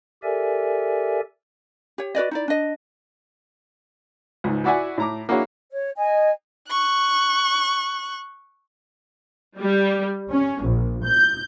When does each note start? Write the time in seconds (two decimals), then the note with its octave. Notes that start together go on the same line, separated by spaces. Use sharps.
0.23 G4 A4 A#4 D5 E5 G#5
1.98 G4 C#5
2.15 F#4 B4 D5 D#5
2.31 D#4 E4 D5
2.48 D4 D#5
4.44 C#2 G#2
4.64 E4 F#4 D5 E5 F#5 G#5
4.98 A2 A#5 D6
5.29 A#3 D4 E4 F#4 G#4 C#5
5.71 C#5
5.97 D#5 G#5
6.69 C#6 F#6
9.59 G3
10.31 C#4
10.64 A#1
11.05 G6